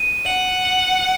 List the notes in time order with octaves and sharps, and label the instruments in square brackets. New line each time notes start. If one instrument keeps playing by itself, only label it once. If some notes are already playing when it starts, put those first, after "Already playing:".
Already playing: [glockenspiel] D#7
[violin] F#5 [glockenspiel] F#7
[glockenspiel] F#7